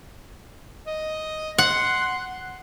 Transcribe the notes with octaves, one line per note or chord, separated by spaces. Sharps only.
D#5
F#5 C6